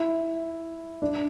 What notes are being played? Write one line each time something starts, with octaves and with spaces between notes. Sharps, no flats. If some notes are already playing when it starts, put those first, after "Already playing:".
Already playing: E4
D4